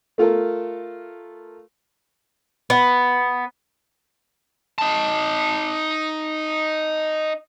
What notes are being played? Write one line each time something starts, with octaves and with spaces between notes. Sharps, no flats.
A3 F4 A4 A#4
B3
D#4 A5